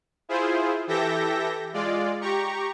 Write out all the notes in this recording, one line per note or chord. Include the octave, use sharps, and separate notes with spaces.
E4 F4 G#4 C5
E3 G4 A4 E5 G6 A#6
G#3 F4 D5
G4 A#5 C#6